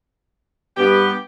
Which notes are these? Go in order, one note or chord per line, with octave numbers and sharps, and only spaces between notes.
G2 B3 G4